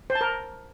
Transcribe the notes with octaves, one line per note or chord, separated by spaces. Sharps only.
C5
A5
A#4